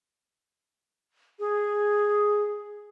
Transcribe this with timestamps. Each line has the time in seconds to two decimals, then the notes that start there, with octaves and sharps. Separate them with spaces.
1.39 G#4